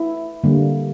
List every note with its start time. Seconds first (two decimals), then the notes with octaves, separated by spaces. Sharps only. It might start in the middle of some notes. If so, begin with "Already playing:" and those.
Already playing: E4
0.44 D3 G3 A#3